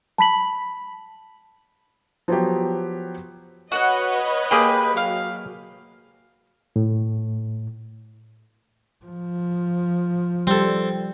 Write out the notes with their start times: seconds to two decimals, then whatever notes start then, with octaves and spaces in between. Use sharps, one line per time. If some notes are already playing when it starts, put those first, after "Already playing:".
0.18 A5 B5 B6 F#7
2.28 F3 F#3 B3 G4
3.72 F#4 B4 C#5 D#5 F#5
4.51 A#3 G4 G#4 G5 B5 D#6
4.97 F#3 F5
6.76 A2
9.06 F3
10.47 G3 C4 A4